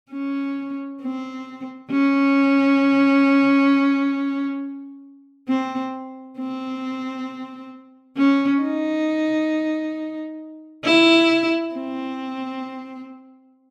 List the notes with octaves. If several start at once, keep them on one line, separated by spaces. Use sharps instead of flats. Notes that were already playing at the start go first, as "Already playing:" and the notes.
C#4
C4
C#4
C4
C4
C#4
D#4
E4
C4